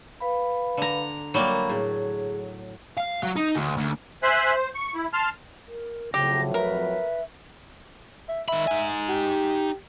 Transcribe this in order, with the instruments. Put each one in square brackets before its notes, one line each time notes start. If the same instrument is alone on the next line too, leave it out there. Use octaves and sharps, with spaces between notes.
[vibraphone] B4 F5 B5
[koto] D3 A#5
[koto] F#3 G3 A#3 [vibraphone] B5
[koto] A2 [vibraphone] G#4
[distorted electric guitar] F5
F#3
D#4
D2
D2
[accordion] C5 E5 G#5 C6 F#6
C5
C#6
E4
A5 C6 F6
[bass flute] A#4
[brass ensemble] F2 A2 F#3 [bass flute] C#3 [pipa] G4 [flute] A#6
[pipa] A#4 [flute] B4 [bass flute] E5
[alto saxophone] E5
[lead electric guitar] D#3 B5 [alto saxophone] E5
[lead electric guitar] D#4 G#5
[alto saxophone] G4